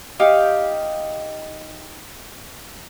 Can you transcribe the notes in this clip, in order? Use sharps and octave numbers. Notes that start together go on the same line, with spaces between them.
D#4 G4 F5